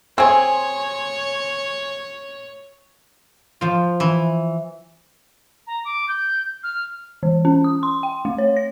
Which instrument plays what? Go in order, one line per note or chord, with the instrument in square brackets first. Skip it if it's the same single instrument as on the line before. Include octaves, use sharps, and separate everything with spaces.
[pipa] C4 G#4 [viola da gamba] C#5 [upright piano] G#5 C6
[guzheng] F3 F4
[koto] E3
[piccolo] A#5
D6
G6
F6
[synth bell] E3
C#4
D#6
C6
G5
A3
C#5
A#6